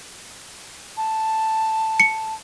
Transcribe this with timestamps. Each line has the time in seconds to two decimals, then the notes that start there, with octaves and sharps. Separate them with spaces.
0.97 A5
2.00 C#7